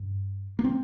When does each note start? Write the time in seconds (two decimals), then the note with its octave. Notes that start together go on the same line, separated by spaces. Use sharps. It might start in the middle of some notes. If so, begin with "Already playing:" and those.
Already playing: G2
0.59 A#3
0.64 C4